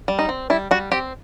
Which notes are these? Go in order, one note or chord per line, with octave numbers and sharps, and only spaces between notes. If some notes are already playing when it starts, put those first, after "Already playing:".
G3
D#4
C4
G3 E4
G3 F#4
C4 G4